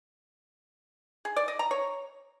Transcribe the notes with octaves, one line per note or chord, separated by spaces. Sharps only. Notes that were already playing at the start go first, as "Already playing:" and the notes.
G#4
D5
D#5
A#5
C#5